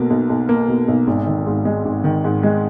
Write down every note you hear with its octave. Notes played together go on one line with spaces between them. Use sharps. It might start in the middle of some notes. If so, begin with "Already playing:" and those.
Already playing: B1 B2 A#3
B1
B1
A#3
B2
B1
G#1
D#3
G#2
G#3
G#1
D#3
G#2
G#3